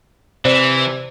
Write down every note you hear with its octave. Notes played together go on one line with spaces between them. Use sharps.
C3 E3 C5 D5